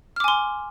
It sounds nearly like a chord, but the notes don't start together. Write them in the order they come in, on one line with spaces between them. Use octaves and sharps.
F6 D6 G#5 C6